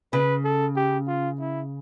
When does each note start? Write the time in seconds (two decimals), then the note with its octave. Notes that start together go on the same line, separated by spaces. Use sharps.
0.13 C#3 B4
0.44 A4
0.76 G4
1.08 F4
1.40 E4